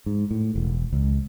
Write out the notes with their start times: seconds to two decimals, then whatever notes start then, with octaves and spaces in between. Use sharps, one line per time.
0.06 G#2
0.31 A2
0.55 E1
0.93 C#2